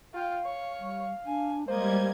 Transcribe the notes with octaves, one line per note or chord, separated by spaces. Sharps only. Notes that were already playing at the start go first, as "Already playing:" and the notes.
F4 F5 G5
C#5
G3
D4 G#5
G3 G#3 A#3 C5 D#5 G#6